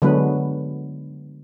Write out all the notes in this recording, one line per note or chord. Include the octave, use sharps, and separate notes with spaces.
D3 F#3 G#3 B3 B4